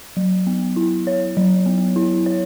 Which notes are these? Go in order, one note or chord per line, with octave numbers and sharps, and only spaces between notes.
F#3
B3
E4
C#5
F#3
B3
E4
C#5